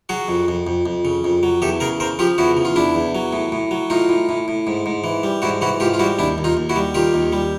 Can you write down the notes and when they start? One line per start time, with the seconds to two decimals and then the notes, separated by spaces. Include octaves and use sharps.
0.09 F#3 F#4 G#4
0.28 F2
0.48 F2
0.67 F2
0.86 F2
1.05 C#3
1.24 F2
1.43 F#3
1.62 E2 G4 A4
1.80 C#3 G#4 A#4
2.00 C#3 A#4 C5
2.19 F3 F4 G4
2.38 E2 E4 F#4
2.57 C#3
2.65 F4
2.76 E2 D4 E4
2.95 E2
3.15 F#3
3.33 A2
3.52 A2
3.71 F#3
3.90 A2 D#4 F4
4.09 A2
4.29 A2
4.48 A2
4.67 G#2
4.86 G#2
5.04 E3
5.23 G3
5.42 G#2 E4 F#4
5.61 E3 E4 F#4
5.80 G#2 F4 G4
5.94 F4
5.99 G3 E4 F#4
6.19 D#2 D4 E4
6.38 D#2
6.44 D#4 F4
6.57 D#2
6.69 E4 F#4
6.76 G3
6.94 D#3 F4 G4
7.14 D#2
7.33 G3